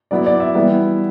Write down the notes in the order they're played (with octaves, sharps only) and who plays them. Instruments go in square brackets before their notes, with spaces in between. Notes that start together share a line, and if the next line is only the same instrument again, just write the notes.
[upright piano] F#3 B3 E4 D5
D5
E5
E3 G3 B3 E4